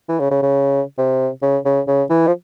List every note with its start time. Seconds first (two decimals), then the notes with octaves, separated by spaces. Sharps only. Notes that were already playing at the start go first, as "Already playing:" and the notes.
0.09 E3
0.20 C#3
0.31 C#3
0.42 C#3
0.98 C3
1.42 C#3
1.65 C#3
1.88 C#3
2.10 E3
2.27 F3